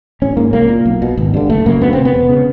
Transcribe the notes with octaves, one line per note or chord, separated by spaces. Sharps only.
A1 C#4
G#2 A#3
C2 A#3
A#2
B1
B2
G#1
G2 D3
F#1 A3
F#2 C#3 A#3
D2 B3
C3 C4
B3
E1
C#3